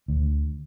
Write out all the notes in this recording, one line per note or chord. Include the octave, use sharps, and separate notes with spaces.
D2